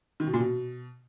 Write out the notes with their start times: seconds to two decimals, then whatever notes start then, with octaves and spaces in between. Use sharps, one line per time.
0.20 D#3
0.27 B2
0.33 A#2
0.40 B2